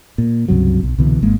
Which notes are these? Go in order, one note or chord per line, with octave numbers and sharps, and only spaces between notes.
A#2
C#2 G2 C3 F#3
B1
C2 B2 D3 E3
G#1 G#3 A#3